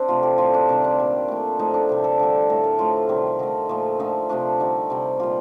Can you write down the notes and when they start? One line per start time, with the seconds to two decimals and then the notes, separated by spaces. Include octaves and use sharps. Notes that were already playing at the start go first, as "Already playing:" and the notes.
Already playing: C4 D4
0.08 C3 F3 A3 F4
0.23 G4
0.38 A2 G3 F4
0.54 D4
0.69 C3 D#3 G3 D4
0.84 D4
0.99 A#2 G3
1.28 A#2 A3
1.59 A2 F3 A3 D#4
1.74 D4
1.89 C3 G3
2.04 A4
2.19 D3 G3
2.50 A2 A3 A#4
2.64 A#4
2.79 A2 F3 A3 F4
3.09 C3 D#3 G3
3.39 D3 A3 D#4
3.69 A#2 F3 A3
3.99 D3 F3 A3 D#4
4.29 C3 F3 A3 D4
4.60 D3 G3 D#4
4.90 C3 G3
5.20 A#2 G3 F4